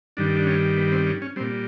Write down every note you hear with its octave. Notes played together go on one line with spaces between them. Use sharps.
G2 D#3 G3 D4
D4
C#4
B3
C4
C#4
C#4
A#2 G3 C4